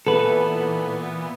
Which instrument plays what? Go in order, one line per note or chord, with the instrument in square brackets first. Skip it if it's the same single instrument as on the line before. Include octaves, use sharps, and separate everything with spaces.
[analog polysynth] A#2 E3 B3 [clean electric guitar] A4 B4